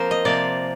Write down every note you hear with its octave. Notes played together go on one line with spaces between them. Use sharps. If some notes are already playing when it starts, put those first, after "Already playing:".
Already playing: F3 A#3 C4 A#4 C5
D#5
C3 F3 A#3 D5